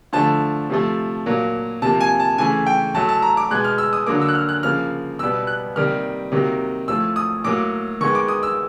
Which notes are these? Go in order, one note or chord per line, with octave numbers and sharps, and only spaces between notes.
D3 F3 A3 A5
C3 F3 A3
A#2 F#3 A#3
C3 F3 A#3 A5
G#5
A5
C#3 E3 A3 G#5
G5
A2 F#3 A3 A5
A5
A#5
D6
B2 G#3 B3 F#6
F6
E6
D#6
D3 F#3 A#3 D6
E6
F#6
F6
F#6
C#3 F3 A#3 F6
B2 G3 B3 E6
F#6
C3 D#3 G3 A#3 F6
C3 D#3 F#3 A#3
A2 F3 A3 E6
D#6
A2 F#3 A#3 D6
D#3 G#3 B3 C#6
D6
D#6
E6